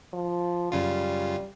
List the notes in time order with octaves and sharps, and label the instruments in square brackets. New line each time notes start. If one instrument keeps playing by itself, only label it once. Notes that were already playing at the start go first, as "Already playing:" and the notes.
[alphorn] F3
[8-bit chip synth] F#2 C#3 F4 [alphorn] G3